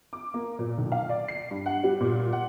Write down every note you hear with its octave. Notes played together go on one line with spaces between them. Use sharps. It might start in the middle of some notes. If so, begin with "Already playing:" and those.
D6
A#3
A#2
B1
F5
D5
C7
G2
F#5
G3
A#2
F#5